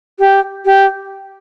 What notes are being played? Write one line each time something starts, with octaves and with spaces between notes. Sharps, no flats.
G4
G4